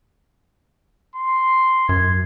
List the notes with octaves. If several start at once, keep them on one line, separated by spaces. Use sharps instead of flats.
C6
F#2 G#6